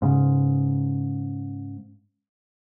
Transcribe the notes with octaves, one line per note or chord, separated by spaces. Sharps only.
G#2 C#3